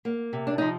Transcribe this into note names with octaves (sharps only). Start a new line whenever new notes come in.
A#3
C3
D4
F3 D#4